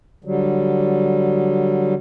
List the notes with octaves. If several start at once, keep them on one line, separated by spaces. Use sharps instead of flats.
D3 F#3 G3